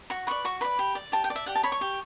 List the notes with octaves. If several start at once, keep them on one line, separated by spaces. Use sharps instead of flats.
F#4 C#6
B4 D5 C#6
F#4 C#6
B4 D5 B5
G4
D5
G4 A5
G5
D5
E5
G4 F#5
A5
C#5 B5
C#6
G4